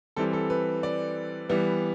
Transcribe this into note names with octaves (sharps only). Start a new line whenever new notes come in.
E3 G3 C4 A4
A4
B4
D5
E3 G3 B3